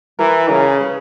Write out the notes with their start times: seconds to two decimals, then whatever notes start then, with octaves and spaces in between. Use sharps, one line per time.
0.19 E3 A#4
0.49 C#3 A#4
0.80 B4